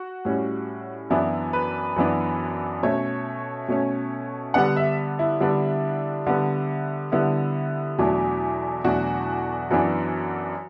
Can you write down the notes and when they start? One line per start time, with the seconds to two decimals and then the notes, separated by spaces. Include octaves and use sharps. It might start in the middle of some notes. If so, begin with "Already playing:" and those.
Already playing: F#4
0.25 A2 G3 C#4
1.10 F#2 E3 B3 D4 E4
1.53 B4
1.96 F#2 E3 B3 D4
2.83 B2 A3 C#4 C#5
3.68 B2 A3 C#4
4.54 D3 G3 B3 D4 F#5
4.76 E5
5.19 E4
5.40 D3 G3 B3 D4
6.27 D3 G3 B3
7.12 D3 G3 B3 E4
7.98 E2 B2 F#3 A3 D4
8.84 E2 B2 F#3 A3 D4 F#4
9.71 F#2 E3 B3 D4